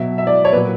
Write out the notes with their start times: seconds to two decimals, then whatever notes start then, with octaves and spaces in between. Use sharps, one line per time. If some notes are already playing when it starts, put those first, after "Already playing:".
Already playing: B2 F#3 E5
0.18 E5
0.27 D5
0.45 C#5
0.52 A#2 F#3 B4